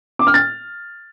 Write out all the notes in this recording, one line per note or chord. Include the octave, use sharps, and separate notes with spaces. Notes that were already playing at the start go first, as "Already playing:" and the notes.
D6
F6
A6